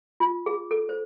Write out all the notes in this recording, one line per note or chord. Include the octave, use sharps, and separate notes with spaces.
F4
G#4
A4
C5